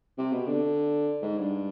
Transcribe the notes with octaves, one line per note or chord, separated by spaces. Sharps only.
C3
B2
D3
G#2
G2